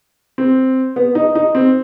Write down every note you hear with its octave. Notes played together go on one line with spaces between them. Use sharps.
C4
B3
D#4
D#4
C4